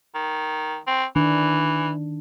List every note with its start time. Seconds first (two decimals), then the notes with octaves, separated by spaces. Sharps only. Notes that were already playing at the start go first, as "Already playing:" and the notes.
0.15 D#3
0.87 C4
1.16 D#3 E3 D4